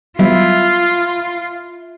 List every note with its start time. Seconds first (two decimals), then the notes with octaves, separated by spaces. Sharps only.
0.19 F#3 G3 B3 E4 F4 E5